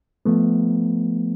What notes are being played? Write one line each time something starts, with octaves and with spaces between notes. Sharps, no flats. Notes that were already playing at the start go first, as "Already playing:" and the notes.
F3 A3 B3